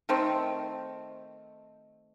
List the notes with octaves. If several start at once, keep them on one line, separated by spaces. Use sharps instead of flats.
D#3 A3 C4